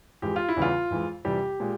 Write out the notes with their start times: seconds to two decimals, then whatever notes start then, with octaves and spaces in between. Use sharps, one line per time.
0.22 F2 E3 G#3 G4
0.36 F4
0.49 E4
0.57 E2 C#3 E3 G3 F4
0.91 F2 E3 G#3
1.25 F2 C3 E3 G3 G4
1.60 A#2 G#3